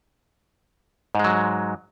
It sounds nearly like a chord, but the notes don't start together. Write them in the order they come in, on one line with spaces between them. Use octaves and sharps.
G#2 G#3 F#3